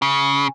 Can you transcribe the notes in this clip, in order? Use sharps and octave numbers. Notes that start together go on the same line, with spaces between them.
C#3